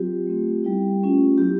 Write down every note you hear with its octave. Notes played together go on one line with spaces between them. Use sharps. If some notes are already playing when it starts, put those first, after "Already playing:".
Already playing: F#3 C4 F4 G4
A3 C4 F4
G3 B3 E4
A3 C#4 F4
F#3 B3 E4 G4